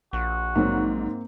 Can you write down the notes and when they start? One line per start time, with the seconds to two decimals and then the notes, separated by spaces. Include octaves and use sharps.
0.13 A#1 F#4
0.55 G#2 F#3 A#3 C4